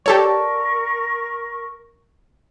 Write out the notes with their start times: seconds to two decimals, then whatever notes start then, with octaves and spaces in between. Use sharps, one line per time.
0.06 G4 A4 A#4 C#5 D5 A5 C#6